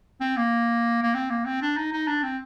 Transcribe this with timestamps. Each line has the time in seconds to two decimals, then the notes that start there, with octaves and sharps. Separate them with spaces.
0.21 C4
0.37 A#3
1.03 A#3
1.14 C4
1.30 A#3
1.45 C4
1.62 D4
1.77 D#4
1.93 D#4
2.08 D4
2.23 C4